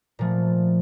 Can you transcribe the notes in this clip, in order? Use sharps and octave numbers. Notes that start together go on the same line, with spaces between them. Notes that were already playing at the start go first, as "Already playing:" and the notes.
A#2 F3 A3